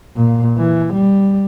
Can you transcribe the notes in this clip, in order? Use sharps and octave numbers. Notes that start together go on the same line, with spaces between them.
A#2
E3
G3